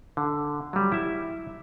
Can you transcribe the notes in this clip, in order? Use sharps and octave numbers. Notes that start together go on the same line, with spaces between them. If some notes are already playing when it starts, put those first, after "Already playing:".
D3
F#3 G3
E4 E5